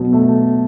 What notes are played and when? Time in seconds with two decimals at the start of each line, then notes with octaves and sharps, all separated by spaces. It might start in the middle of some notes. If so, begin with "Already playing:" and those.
Already playing: B2 F#3
0.13 A3